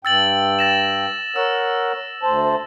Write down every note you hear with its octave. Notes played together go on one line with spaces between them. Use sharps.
G2 G5 E6 A6 F#7
A6 A#6 E7
A#4 C#5 F#5 E6
D2 C5 A5